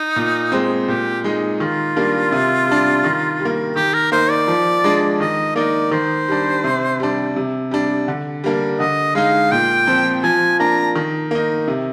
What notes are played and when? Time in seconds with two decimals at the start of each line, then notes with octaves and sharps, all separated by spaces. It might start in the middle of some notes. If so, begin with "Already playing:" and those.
Already playing: D#4
0.16 A#2
0.52 G#3 C4
0.88 A#2 G4
1.24 G#3 D#4
1.60 D#3 F4
1.96 G3 A#3 D4
2.32 C3
2.68 G3 D4
3.04 D#3
3.40 G3
3.45 A#3
3.76 D#3 G4
3.94 A#4
4.12 A#3 D#4 C5
4.30 D5
4.48 F3
4.84 G#3 D4
5.20 D#3 D#5
5.56 A#3 D#4 D5
5.91 D#3 C5
6.28 G3 D4
6.64 C3
7.00 G3 D4
7.36 C3
7.71 G3 D4
8.08 D3
8.44 G3 A#3 D4
8.79 D3 D#5
9.15 G#3 D#4 F5
9.51 A#2 G5
9.87 F3 C4
10.24 F3 G#5
10.59 A#3 D4 A#5
10.95 D#3
11.31 A#3 D#4
11.68 C3